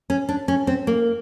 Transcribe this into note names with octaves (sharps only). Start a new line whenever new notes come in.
C#4
D4
C#4
C4
A#3